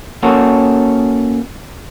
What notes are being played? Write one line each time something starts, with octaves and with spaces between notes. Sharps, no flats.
A#3 C#4 F#4 A4